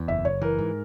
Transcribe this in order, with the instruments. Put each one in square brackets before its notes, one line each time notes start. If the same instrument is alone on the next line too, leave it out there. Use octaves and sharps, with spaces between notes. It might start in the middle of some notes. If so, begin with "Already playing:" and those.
Already playing: [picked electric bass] E2
[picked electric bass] F#1 [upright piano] E5
[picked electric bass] F#1 [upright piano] C#5
[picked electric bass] E3 [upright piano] A#4
[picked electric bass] G#2